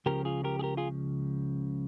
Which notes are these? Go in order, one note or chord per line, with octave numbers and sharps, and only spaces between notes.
C#2 C#3 F3 G4 A#4
F4 G#4
G4 A#4
G#4
G4 A#4
F4 G#4